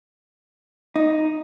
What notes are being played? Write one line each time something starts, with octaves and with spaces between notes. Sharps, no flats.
D#4